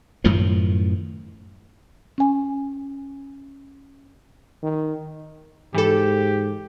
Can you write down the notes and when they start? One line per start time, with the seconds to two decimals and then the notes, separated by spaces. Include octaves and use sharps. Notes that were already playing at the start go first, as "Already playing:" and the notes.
0.24 F#2 A2 D#3 F3
2.18 C#4 G#5
4.63 D#3
5.74 G#2 E3 G4 A4